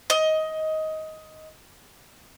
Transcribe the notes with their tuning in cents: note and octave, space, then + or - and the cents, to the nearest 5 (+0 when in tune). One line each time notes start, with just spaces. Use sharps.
D#5 +15